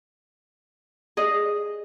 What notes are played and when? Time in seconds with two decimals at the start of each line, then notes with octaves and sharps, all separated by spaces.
1.17 G#4 D#5